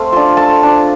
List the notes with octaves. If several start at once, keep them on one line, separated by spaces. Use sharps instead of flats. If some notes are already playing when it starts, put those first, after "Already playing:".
Already playing: A3 C4 F5
D4 F4
A3 A5
D4 F4